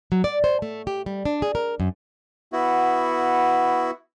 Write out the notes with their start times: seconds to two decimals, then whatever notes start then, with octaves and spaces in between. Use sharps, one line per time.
0.12 F#3
0.24 D5
0.44 C5
0.62 A3
0.87 G4
1.06 G3
1.25 D4
1.42 G#4
1.55 A#4
1.80 F#2
2.52 B3 E4 F#4